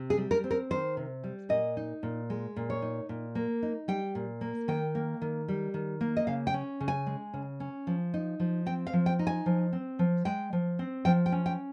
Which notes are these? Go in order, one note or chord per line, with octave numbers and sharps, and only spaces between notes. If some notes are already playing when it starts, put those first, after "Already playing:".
Already playing: C3
G#4
G3
A#4
C4
A#4
D#3 C5
C3
G3
A#2 D#5
D#4
A#2
G#3
A#2
C#5
D#4
A#2
A#3
D#4
G3 G5
A#2
A#3
D#3 G5
A#3
D#3
G3
D#3
A#3
D#5
C#3 F5
G5
C#4
C#3
G#5
G#3
C#3
C#4
F3
D#4
F3
C4 G5
F5
F3
G5
D#4
G#5
F3
C4
F3
G#3 G5
F3
C4
F3 G5
G5
C#4
G5